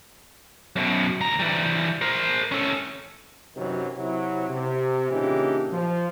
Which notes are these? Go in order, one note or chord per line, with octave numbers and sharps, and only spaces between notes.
F#2 B2
D2 A#5
E3 G3
A#4 C5
C#4 A4
F#2 C3 D#3 E3 F#3
C3 F#3 E4
C3
A#2 C#3 E3 D4 D#4 G4
F3